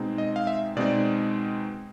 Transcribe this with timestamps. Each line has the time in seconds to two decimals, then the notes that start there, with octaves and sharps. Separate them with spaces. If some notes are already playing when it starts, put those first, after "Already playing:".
Already playing: B2 G#3 C4 D#4
0.18 D#5
0.36 F5
0.47 E5
0.77 B2 G#3 C4 D#4 D5